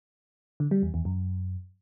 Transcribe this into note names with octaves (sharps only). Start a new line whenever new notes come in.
D3
G3
E2
E2
F#2